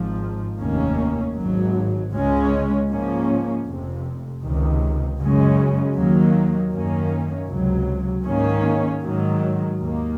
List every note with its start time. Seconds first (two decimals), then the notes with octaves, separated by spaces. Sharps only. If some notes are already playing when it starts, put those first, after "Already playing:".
Already playing: G#1 G#2 F3
0.58 F1 D#2 D#3 A#3 C#4
1.35 G#1 G#2 F#3
2.12 C#2 C#3 G#3 C#4
2.88 G#2 F3 A#3 C#4
3.65 F1 F2 C3
4.42 C#2 C3 D#3
5.18 F#2 C#3 G#3 C#4
5.95 D#2 D#3 F#3 A#3
6.71 F#2 D#3 A#3 C#4
7.48 C#2 C3 F#3
8.25 G#2 D#3 A#3 C#4
9.02 G#2 D#3 F#3
9.78 D#2 D#3 A#3